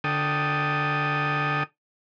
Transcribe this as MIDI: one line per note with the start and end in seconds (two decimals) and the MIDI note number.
0.04 1.63 50
0.04 1.63 69
0.04 1.63 79
0.04 1.63 87